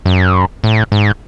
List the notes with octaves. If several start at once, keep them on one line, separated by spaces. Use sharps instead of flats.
F#2
A2
G#2